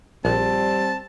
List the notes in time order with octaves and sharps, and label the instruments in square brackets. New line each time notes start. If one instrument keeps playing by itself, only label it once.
[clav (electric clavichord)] A#1 [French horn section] G3 [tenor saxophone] C4 [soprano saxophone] A5